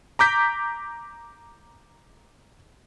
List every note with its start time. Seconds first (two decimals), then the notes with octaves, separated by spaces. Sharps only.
0.19 A#5 D6 G6 B6